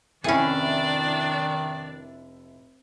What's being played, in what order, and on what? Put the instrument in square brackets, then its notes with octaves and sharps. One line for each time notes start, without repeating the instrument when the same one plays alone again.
[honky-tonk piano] F1 E4 B5 [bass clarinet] D#3 [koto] C#4 G#4 [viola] D4 D5